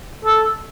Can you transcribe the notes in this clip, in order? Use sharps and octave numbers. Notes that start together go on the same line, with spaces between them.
A4